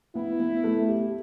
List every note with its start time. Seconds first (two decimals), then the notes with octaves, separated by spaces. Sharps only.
0.15 B3 E4
0.40 B3
0.64 A3
0.88 G4